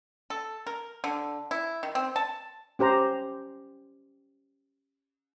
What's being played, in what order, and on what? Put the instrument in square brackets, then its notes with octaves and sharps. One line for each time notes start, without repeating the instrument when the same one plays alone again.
[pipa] A4
A#4
D3
E4
D#3
C4
A5
[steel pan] C#4 G4 C5 A#5